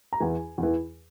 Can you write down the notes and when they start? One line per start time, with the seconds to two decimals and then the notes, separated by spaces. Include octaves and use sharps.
0.13 A#5
0.20 E2 E3 G#5
0.58 E2 E3